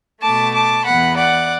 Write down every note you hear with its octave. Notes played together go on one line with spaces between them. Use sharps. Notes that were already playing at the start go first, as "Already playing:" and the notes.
B2 A3 A5 D6
A5 D6
E2 E3 B3 F#5 B5
D5 F#5